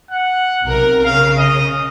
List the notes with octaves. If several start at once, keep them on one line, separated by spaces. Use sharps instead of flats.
F#5
B1 C3 A#4
C#3 F5
D#5